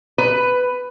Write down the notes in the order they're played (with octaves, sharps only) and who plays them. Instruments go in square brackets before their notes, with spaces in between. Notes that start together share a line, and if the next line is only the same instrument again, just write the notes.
[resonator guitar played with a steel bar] B4